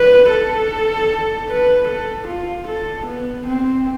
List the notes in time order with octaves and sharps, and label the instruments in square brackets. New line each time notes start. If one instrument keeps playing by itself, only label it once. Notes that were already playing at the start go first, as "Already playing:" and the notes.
Already playing: [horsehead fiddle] B4
A4
B4
A4
F4
A4
B3
C4